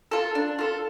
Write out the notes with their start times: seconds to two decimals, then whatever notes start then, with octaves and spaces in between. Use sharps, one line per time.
0.11 F4 A4
0.35 D4
0.59 F4 A4